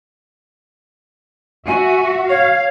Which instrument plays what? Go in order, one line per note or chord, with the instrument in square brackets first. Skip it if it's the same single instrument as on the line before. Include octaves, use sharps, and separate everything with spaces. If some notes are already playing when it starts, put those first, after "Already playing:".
[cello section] F#4 E5 [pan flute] G#5
[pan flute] C#5 [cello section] F5